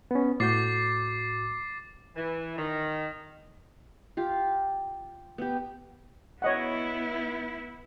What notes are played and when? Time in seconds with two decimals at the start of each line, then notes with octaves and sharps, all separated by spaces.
0.11 B3 C#4
0.40 A2 F#4 D6 G6 A6 C7
2.16 E3
2.57 D#3
4.17 F4 G4
5.38 B3 G4
6.42 B3 E4 C#5 D#5 F#5